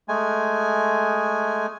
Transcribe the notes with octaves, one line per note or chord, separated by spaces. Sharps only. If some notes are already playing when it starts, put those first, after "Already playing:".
G#3 A3 G#5